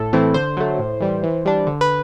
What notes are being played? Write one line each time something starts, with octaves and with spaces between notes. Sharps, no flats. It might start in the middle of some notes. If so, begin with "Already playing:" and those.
Already playing: A2 A4
E3 A3 C4 E4
D3 C5
F#3 A3
A2
E3 G3
E3
G3 D4
D3
B4